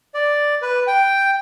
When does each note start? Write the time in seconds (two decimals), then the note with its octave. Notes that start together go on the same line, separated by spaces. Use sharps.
0.14 D5
0.62 B4
0.87 G5